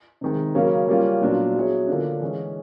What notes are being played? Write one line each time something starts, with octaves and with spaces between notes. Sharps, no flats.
C3 D#3 G#3
C#3 F#3 A#3 C#4
G3 A#3 C#4 F4
A#2 F#3 B3 D4 F4
F#3 B3 E4 G#4 C#5
D3 F3 A#3 D4
E3 G#3 C#4